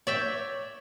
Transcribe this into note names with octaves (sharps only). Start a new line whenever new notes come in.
C#5 D5 E5 G5